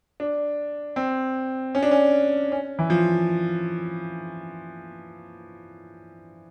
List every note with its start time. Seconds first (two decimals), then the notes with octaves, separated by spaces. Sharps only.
0.20 D4
0.96 C4
1.75 C#4
1.83 D4
1.91 C#4
2.52 C#4
2.79 E3
2.90 F3